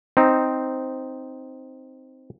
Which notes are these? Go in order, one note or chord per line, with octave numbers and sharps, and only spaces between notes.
C4 D#4